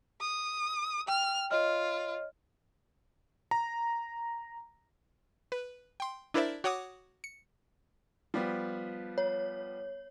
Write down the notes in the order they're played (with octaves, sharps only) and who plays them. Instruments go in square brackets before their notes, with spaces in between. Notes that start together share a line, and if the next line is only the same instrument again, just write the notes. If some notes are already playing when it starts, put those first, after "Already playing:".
[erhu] D#6
[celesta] G5 [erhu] F6
[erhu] F4 [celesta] C#5 D#5 F6
[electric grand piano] A#5
[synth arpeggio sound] B4
G5 C6
D4 E4 A#4 C5 D5 E5
F#4 C#5 F#5 D6 D#6
C#7
[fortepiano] F3 G3 B3
[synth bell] C#5